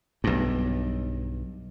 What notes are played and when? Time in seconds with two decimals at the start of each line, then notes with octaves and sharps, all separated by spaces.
0.24 B1 G2